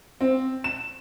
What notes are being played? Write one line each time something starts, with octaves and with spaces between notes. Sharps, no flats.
C4
E7